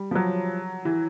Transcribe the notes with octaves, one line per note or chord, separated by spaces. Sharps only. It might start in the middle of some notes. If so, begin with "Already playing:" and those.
Already playing: G3
F3
F#3
E3